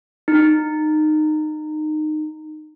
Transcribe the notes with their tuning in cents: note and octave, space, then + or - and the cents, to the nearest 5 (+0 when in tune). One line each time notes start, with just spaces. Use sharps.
D#4 -20